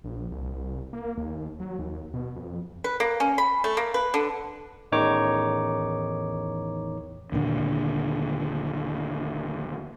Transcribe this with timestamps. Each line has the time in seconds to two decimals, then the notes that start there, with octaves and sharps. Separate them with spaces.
0.04 A#1
0.31 C2
0.93 A#3
1.18 D#2
1.60 F#3
1.79 D#2
2.14 B2
2.36 F2
2.84 B4
3.00 A#3
3.20 C#4
3.38 B5
3.64 A3
3.77 A#3
3.94 B4
4.14 D3
4.92 A1 E2 D#3 D#4 C#5 D6
7.32 D#2 A#2 D3